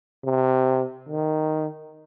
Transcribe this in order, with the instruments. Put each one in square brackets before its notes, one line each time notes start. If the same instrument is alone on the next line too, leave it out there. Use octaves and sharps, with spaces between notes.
[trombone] C3
D#3